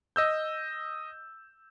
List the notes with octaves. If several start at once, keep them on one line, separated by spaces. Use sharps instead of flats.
D#5 E6 G6